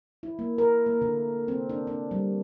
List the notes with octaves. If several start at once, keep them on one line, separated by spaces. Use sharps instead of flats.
E4
A#3
A#4
A#3
D3
C4
D4
D4
G3